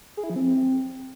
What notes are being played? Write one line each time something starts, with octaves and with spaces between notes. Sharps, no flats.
G#4
E4
F3
C4